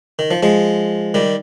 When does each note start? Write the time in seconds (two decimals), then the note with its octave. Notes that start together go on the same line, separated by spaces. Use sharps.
0.19 D#3
0.31 F3
0.43 F3 G#3
1.14 D#3 G3